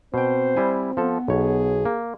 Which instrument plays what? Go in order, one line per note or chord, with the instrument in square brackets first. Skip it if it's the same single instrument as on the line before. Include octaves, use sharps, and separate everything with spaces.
[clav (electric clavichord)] B2 G5 [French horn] C4 [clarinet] C5
[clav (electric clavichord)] G3 E4 G#5
[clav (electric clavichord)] F3 A4 [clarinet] B3
[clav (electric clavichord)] B1 C#5 [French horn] G#4
[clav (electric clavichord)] A#3